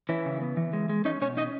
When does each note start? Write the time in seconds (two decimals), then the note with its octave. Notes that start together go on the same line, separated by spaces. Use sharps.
0.09 E3 C#4 E4
0.26 C#3
0.41 B3
0.57 E3
0.73 G#3
0.89 G#3
1.05 C#4 D#4 D#5
1.21 B2 C#4 C#5
1.37 C#4 D#4 D#5